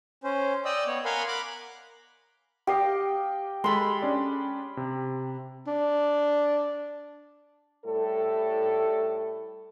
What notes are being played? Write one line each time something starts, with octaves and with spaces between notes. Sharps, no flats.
C#4 C5
D5 D#5 G5 D#6 E6
B3 C#5
A#4 F5 F#5 G#5 B5 C6
A#5 B5 D6 F#6
G4 D#5 F5 C7
G#3 A4 B5 C6
C#4 D4 D5
C3
D4
A2 G3 A4